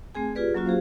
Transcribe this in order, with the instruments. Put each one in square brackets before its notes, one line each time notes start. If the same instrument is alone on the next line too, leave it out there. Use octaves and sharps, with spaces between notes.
[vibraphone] A3 C4 G#4 G#5
F4 G4 G#4 B4 D5
F#3 A#3 C#4 F4 F#4
G4 G#4 C5 F5